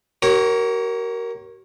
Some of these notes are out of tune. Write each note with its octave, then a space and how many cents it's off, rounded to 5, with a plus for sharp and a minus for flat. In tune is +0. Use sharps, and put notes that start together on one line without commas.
F#4 +45 A#4 +0 C#5 -20